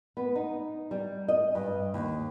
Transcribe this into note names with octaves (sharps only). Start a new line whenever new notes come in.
B3
D#4
G3
D#5
G2
D#2